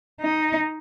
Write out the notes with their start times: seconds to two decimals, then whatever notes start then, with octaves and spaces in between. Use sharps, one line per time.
0.21 D#4